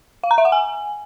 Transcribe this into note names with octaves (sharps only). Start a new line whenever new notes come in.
F5
A#5
E5
F#5
G#5